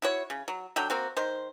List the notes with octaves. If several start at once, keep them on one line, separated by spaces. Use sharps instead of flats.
E4 F#4 C#5
C#3
F#3
D3 F#3 G5
A#3 C4 F#4
D#3 C5